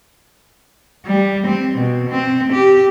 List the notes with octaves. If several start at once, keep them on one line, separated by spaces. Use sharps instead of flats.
G3
C4
B2
C4
G4